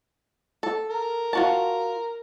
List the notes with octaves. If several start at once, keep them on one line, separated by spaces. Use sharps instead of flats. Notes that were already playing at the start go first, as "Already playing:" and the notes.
A4
A#4
F4 F#4 A5